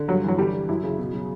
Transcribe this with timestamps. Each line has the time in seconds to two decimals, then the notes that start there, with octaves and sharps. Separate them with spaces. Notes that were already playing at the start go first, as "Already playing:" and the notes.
Already playing: D3
0.08 G2 F#3
0.23 E3 F#3
0.38 D3 G3
0.54 G3
0.68 F#2 E4
0.83 C#3
0.98 B2
1.14 F#3